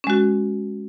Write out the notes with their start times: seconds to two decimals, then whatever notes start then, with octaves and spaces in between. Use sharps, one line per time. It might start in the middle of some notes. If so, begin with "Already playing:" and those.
0.04 C#4
0.07 G#3
0.10 F#4